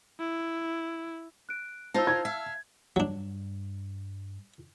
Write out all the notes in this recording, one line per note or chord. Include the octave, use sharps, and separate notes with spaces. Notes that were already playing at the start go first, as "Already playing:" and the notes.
E4
F#6 D7
D#4 F4 C5 A5 E6
G#6
E5 F5
G2 F#3 D4